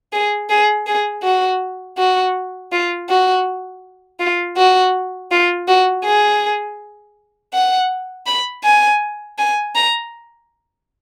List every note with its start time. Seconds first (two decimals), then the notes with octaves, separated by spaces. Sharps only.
0.13 G#4
0.50 G#4
0.87 G#4
1.23 F#4
1.98 F#4
2.72 F4
3.09 F#4
4.20 F4
4.57 F#4
5.32 F4
5.68 F#4
6.04 G#4
7.53 F#5
8.27 B5
8.64 G#5
9.38 G#5
9.75 A#5